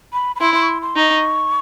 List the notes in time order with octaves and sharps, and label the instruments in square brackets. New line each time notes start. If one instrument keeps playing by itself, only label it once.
[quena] B5
B5
[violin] E4 [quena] C6
[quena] C6
C#6
C6
C6
[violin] D#4 [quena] C#6